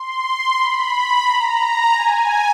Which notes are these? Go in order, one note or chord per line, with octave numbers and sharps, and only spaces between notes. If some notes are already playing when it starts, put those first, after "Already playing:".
Already playing: C6
B5
A#5
G#5